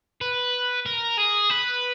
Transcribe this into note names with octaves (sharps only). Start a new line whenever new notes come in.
B4
A#4
G#4
B4